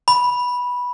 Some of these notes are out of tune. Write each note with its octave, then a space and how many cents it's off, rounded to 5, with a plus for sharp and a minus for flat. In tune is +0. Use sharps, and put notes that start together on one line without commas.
B5 -10